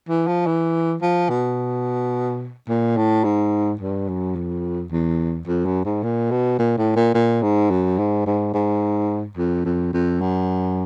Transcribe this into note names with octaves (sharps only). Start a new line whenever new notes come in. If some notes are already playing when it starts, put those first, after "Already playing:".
E3
F3
E3
F3
B2
A#2
A2
G#2
G2
F#2
F2
E2
F2
F#2
G#2
A#2
B2
A#2
A2
A#2
A#2
G#2
F#2
G#2
G#2
G#2
F2
F2
F2
F#2